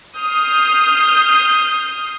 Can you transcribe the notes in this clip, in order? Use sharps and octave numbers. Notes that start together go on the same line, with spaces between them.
D#6 F6 G6 C7